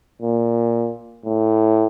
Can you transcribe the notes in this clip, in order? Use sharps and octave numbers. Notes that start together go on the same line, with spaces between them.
A#2
A2